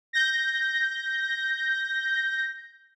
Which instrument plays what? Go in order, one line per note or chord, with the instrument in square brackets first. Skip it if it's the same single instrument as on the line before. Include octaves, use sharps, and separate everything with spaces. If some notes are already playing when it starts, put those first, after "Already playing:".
[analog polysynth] G6 A#6